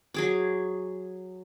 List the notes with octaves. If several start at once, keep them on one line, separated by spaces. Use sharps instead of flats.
F#3 G#4 D6